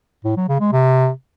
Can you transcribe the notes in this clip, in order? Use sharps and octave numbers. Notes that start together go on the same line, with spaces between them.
A2
F#3
C#3
G#3
C3